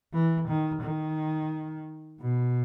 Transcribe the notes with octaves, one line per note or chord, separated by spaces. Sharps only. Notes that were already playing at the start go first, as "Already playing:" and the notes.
E3
D#3
D#3
B2